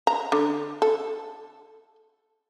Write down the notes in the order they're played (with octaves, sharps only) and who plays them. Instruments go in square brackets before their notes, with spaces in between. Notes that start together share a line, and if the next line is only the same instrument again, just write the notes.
[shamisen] A#5
D3
A4